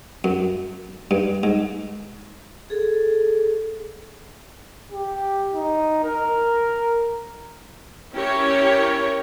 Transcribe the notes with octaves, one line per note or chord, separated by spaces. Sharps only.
F#2
G2
G#2
G#4 A4
G4
D#4
A#4
C#4 E4 G4 A#4 C#5 G5